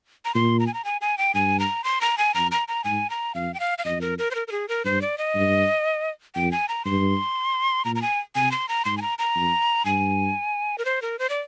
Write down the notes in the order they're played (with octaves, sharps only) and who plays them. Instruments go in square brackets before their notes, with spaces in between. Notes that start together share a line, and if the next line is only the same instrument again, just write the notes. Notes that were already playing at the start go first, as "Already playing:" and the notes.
[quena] A#5
[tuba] A#2 [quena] C6
[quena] A#5
G#5
A#5
G#5
G#5
G5
[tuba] G2 [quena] G#5
[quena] A#5
C6
A#5
G#5
[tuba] F2 [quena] A#5
[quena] A#5
A#5
[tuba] G#2 [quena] G#5
[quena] A#5
[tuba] F2 [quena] F5
[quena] G5
F5
F5
[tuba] F2 [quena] D#5
[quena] A#4
A#4
C5
A#4
A#4
G#4
A#4
[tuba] G2 [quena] C5
[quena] D5
D#5
[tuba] G2
[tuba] F2 [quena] G5
[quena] G#5
A#5
[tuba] G2 [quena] C6
[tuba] A#2 [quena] A#5
[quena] A#5
G#5
[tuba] C3 [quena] G#5
[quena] C6
A#5
[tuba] G#2 [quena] C6
[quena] G#5
A#5
A#5
[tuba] F2
[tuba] G2 [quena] G#5
[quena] A#4
C5
A#4
C5
D5